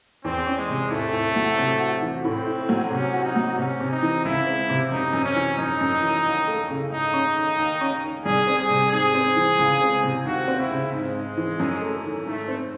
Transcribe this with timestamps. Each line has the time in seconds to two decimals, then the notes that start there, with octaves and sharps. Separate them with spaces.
0.24 E2 C4
0.46 C#4
0.58 G#3
0.69 C3
0.91 A2 A3
1.13 A2
1.36 F#3
1.58 C3
1.80 F#4
2.02 E3
2.24 A2 C4
2.46 E4
2.69 F#3
2.91 C3 C#4
3.13 F#4
3.24 D#4
3.36 F#3
3.58 C3 C#4
3.80 C3
3.91 D#4
4.02 E3
4.25 C#2 E4
4.47 C4
4.69 C3
4.91 F#2 D#4
5.13 F#2
5.24 C#4
5.36 E3
5.58 F#2 D#4
5.81 F#2
6.03 E3
6.25 D#2
6.47 A3
6.70 C#3
6.92 G#2 D#4
7.13 C#4
7.36 D#3
7.58 D#2
7.81 C#4
8.03 D#3
8.25 C2 G#4
8.47 C4
8.59 G#4
8.70 C3
8.92 G#2 G#4
9.14 C4
9.36 E3
9.59 C#2
9.81 C4
10.03 C3
10.26 D#2 F#4
10.48 C4
10.58 E4
10.70 C#3
10.93 G#2 G#3
11.15 G#2
11.37 E3
11.60 F#2
11.82 A3
12.04 D#3
12.26 G#2 A3
12.48 C4